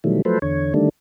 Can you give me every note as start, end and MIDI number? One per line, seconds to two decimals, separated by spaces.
0.04 0.22 47
0.04 0.22 51
0.04 0.22 52
0.04 0.22 54
0.04 0.22 55
0.04 0.22 57
0.25 0.39 53
0.25 0.39 54
0.25 0.39 57
0.25 0.39 69
0.25 0.39 71
0.25 0.39 72
0.42 0.73 40
0.42 0.73 50
0.42 0.73 73
0.74 0.89 50
0.74 0.89 51
0.74 0.89 55
0.74 0.89 57
0.74 0.89 62